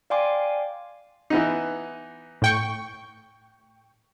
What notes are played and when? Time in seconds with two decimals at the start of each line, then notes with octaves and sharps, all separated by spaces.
0.10 D5 F5 G5 G#5 C6 D6
1.30 E3 B3 D#4
2.42 A2 G5 C#6